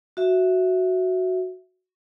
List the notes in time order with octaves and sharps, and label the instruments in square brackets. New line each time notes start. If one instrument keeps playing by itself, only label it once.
[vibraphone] F#4 E5